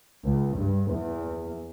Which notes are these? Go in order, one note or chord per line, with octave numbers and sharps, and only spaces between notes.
C#2
G2
E2